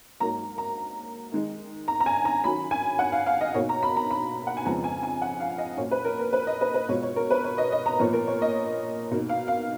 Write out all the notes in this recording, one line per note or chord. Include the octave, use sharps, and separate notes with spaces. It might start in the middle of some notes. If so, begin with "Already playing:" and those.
G#2 F#3 A#3 A#5
A#5
D#3 G#3 D#4
A#5
A#5
G#5
A#5
D#3 F#3 C#4 B5
G#5
F#5
F5
F5
D#5
B2 A#3 D#4 C#5
A#5
B5
A#5
B5
F#5
G#5
F2 C#3 F3 G#3 B3 A#5
G#5
G#5
F#5
F5
D#5
A#2 F#3 C#4 C#5
B4
A#4
A#4
B4
D#5
B4
B4
B2 G#3 B3 F4 C#5
C#5
A#4
B4
C#5
D#5
D#5
A#5
A#2 F3 B3 C#5
A#4
C#5
D#5
B2 A#3 D#4
F5
F5